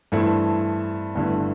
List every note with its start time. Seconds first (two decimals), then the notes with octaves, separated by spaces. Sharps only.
0.12 G2 E3 A3 C4 E4
1.15 G1 G2 D3 A3 E4